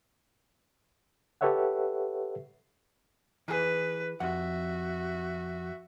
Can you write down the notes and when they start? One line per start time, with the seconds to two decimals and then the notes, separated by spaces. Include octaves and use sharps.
1.41 G4 A4 B4 C#5 E5 F#5
3.48 E3 G#4 B4
4.20 F2 F#4 E5 F#5